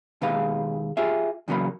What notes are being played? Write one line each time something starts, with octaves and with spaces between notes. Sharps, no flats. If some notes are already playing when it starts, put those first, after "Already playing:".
D#2 B2 G#3 B4 F5
F4 G4 G#4 E5
E2 C#3 F#3 A#3 B5